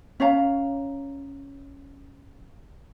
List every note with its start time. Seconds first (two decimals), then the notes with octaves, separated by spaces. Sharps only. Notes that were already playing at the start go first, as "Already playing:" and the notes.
0.20 C#4 C#5 F5 A#5